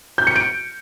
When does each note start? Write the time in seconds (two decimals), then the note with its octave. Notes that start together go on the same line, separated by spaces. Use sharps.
0.18 G6
0.27 C#7
0.36 D7